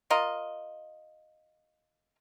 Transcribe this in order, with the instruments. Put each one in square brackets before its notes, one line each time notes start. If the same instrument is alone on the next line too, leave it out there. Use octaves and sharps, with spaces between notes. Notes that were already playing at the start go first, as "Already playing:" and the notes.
[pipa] F4 A#4 D#5